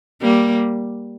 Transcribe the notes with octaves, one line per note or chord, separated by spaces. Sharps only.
G3 A#3